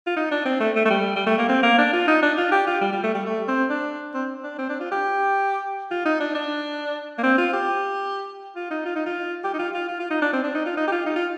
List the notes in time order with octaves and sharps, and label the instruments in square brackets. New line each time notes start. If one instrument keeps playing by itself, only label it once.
[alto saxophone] F4
D#4
D4
C4
A3
A3
A3
G3
G3
A3
A#3
C4
A#3
D4
F4
D#4
D4
F4
G4
F4
G3
G3
A3
G3
A3
C4
D4
C4
D4
C4
D4
F4
G4
F4
D#4
D4
D4
A#3
C4
F4
G4
F4
D#4
F4
D#4
F4
G4
D#4
F4
F4
F4
F4
D#4
D4
C4
D4
D#4
F4
D#4
G4
F4
D#4
F4